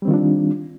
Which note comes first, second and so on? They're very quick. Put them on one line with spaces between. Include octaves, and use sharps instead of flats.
G3 C4 D#3 F4 D4